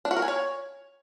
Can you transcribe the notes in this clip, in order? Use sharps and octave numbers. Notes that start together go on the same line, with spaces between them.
D4
F#4
A#4
G#5
C#5